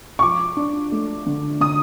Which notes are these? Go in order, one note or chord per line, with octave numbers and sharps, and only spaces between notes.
C#6
F3 D6
D4
A3
D3
D3 D#6